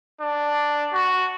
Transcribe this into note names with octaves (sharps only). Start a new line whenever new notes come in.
D4
F#4